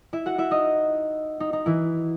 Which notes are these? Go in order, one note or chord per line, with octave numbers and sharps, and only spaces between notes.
E4 E5
F#4 F#5
E4 E5
D#4 D#5
D#4
D#4
E3 E4